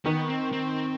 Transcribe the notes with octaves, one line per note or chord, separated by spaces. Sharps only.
D#3 B3
C4
C4